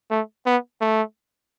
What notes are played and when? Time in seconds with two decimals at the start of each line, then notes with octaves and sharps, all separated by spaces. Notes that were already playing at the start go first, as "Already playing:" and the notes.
0.10 A3
0.46 B3
0.81 A3